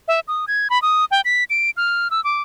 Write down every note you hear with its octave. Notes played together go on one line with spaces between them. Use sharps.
E5
D#6
G#6
B5
D#6
G5
B6
D7
F6
E6
D6